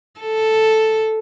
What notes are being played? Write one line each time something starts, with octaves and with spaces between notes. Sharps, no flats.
A4